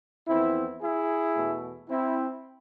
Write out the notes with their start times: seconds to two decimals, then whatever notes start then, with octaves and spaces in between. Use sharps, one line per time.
0.28 F2 E3 B3 C4 E4
0.82 E4 G#4
1.36 E2 B2 A3
1.89 C4 E4